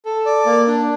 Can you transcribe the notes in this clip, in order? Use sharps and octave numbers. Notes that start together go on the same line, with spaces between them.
A4
D5
A#3
D4